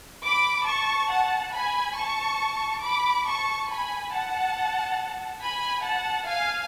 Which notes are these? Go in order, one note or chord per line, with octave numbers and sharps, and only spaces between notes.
B5 D6
A5 C#6
F#5 A5
G#5 B5
A5 C#6
B5 D6
A5 C#6
G#5 B5
F#5 A5
G#5 B5
F#5 A5
F5 G#5